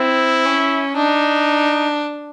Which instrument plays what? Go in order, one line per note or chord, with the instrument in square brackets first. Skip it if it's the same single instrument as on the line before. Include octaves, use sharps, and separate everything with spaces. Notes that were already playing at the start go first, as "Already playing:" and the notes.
Already playing: [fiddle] C4 [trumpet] E4
[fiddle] C#4
[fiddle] D4 [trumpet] D#4